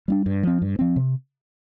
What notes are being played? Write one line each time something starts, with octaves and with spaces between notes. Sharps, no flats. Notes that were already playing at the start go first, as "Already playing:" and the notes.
G3 B3 D4
G2
F3 C4
G2
F3 C4
C3